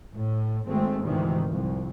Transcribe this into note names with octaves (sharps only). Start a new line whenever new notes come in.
A2
G#1 G#2 G#3 A3 C4
D2 G#2 C3 D#3 E3
C2 F2